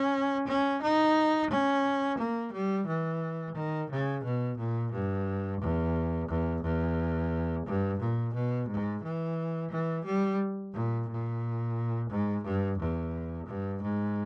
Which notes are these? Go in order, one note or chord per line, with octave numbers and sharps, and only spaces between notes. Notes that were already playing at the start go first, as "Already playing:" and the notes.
Already playing: C#4
C#4
D#4
C#4
A#3
G3
E3
D#3
C#3
B2
A#2
G2
E2
E2
E2
G2
A#2
B2
G#2
E3
E3
G3
A#2
A#2
G#2
G2
E2
G2
G#2